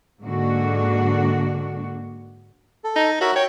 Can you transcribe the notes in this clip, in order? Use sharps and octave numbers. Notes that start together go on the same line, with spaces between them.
G#2 D3 A#3 D4 F#4
A4
D#4
F#4 A#4 C#5 E5
C#5 G5